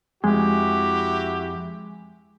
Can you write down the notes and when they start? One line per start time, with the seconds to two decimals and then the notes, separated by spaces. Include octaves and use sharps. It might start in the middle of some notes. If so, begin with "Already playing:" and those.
0.24 F2 G#3 E4 F#4 G4